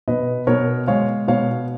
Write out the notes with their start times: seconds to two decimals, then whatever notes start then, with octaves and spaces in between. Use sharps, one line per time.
0.08 B2 B4 D#5
0.47 B2 A#4 C#5
0.87 G#3 C#5 F5
1.28 B2 C#5 F5